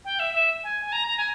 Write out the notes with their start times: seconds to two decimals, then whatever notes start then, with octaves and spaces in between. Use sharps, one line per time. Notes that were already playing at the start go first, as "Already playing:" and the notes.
0.05 G5
0.19 E5
0.34 E5
0.64 G#5
0.85 G#5
0.92 A#5
1.07 A#5
1.17 G#5